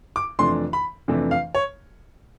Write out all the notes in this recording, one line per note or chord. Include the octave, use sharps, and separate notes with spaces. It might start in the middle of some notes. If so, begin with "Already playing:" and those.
D6
F2 C3 E3 A3 D4 C6
B5
F2 C3 E3 A3 D4
F5
C#5